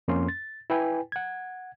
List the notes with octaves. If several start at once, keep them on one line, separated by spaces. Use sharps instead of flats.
F2 A#3 C#4 C6
A6
E4 B4 G5 G#5
F#5 G#6